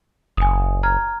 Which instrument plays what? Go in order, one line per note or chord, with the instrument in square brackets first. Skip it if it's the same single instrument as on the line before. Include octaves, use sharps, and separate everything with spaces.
[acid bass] F#1 [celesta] G#5 D#6
[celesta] A#5 F6 G#6